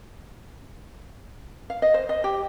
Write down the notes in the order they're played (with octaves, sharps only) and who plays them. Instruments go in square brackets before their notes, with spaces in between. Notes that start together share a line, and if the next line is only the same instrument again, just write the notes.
[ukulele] F5
D#5
C5
D#5
G4